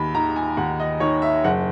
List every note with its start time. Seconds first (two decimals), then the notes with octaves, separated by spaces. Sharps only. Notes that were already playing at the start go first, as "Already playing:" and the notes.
Already playing: D#2 B5
0.15 D#3 A#5
0.36 G#5
0.57 D#2 F#5
0.80 D#5
1.00 D#3 C#5
1.22 E5
1.44 F#1 F#5